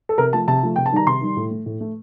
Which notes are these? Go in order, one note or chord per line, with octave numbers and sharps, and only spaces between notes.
A4
C3 A#4
F3 A3 A5
C3 A5
F3 A3
C3 G5
A5
D#3 G3 A#5
C3 C6
D#3 G3
A2
A3
A2
A3